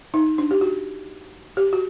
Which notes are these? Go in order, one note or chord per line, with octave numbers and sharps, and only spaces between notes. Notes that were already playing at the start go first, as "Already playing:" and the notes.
D#4
D4
G4
F#4
G4
F#4